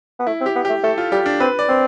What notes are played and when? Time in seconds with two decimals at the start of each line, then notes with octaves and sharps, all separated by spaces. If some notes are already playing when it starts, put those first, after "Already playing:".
0.20 B3
0.27 A3 E4
0.41 C4
0.46 G4
0.55 B3
0.65 A3 G4
0.83 A3 A4
0.98 F4
1.12 G3 G4
1.26 D4
1.40 C4 B4
1.59 D5
1.68 C4